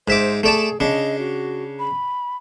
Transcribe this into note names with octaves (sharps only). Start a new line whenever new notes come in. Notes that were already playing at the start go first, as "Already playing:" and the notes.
G#2 C5 E5 D6
A3 G#4 D5 A5
C#3 D4 D#5
F#4
B5